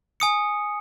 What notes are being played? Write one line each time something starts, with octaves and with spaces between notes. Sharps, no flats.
G#5 D#6 C#7